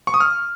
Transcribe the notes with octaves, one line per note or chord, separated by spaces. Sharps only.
C#6
D#6
F6